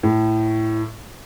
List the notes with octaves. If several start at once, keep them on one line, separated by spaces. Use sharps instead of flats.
A2